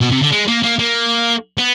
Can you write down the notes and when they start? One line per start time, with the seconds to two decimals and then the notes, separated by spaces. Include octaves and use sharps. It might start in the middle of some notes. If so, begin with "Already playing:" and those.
0.01 B2
0.12 C3
0.22 D3
0.32 G#3
0.48 A#3
0.63 A#3
0.79 A#3
1.58 B3